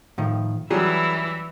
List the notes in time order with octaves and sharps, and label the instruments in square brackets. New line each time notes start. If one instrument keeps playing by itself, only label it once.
[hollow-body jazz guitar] A2 D#3 F3
[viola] E3 E4 [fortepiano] F#3 G3 [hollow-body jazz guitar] G#4